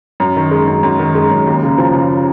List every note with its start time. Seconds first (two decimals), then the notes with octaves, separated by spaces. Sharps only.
0.20 F#2
0.36 D#3
0.51 G#3
0.68 F#2
0.83 F#2
0.99 D#3
1.15 G#3
1.31 F#2
1.47 D#2
1.63 C#3
1.78 F3
1.94 C#3